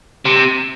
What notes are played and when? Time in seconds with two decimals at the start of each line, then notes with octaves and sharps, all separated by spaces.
0.25 C3